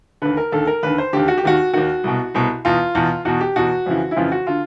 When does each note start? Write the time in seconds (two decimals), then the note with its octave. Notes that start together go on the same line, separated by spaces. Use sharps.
0.22 D#2 D3 B4
0.37 A#4
0.52 D#2 D3 A4
0.67 A#4
0.83 D#2 D3 B4
0.98 C5
1.13 D#2 D3 G4
1.28 F#4
1.38 G4
1.44 D#2 D#3 F#4
1.74 D#2 D#3 F#4
2.04 C2 B2
2.34 C2 B2
2.65 E2 B2 F4
2.95 E2 B2
3.25 E2 B2 F#4
3.41 G4
3.56 E2 B2 F#4
3.86 F2 C#3 E3
4.11 E4
4.16 F2 C#3 E3 F4
4.32 F#4
4.47 D3 F4